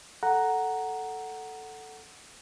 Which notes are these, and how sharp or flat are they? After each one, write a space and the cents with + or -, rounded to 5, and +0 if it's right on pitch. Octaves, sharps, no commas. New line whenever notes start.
A4 +0 F#5 +5 A#5 +0